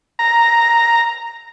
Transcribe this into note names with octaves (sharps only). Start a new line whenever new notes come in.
A#5